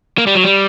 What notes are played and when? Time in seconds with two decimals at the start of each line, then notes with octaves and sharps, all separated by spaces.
0.18 A#3
0.27 G3
0.35 F#3
0.44 G3